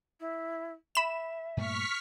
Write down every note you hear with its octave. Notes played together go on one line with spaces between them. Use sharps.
E4
E5 B5 E7
G2 A#2 A3 C#6 F6 B6